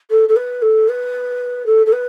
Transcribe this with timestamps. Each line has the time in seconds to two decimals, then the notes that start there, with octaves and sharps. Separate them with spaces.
0.11 A4
0.29 A4
0.36 B4
0.62 A4
0.89 B4
1.66 A4
1.86 A4
1.93 B4